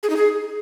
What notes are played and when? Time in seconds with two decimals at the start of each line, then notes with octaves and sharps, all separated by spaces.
0.03 G#4
0.10 D#4
0.17 G#4